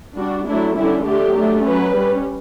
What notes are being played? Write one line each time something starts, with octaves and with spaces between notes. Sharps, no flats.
G3 D4 F#4
F#3 A3 D4 E4
D3 G3 C#4 E4
D3 A3 D4 G4
F#3 A3 D4
F#3 C#4 B4
G3 C#4